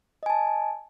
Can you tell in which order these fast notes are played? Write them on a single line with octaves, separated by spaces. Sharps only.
D#5 G#5 A5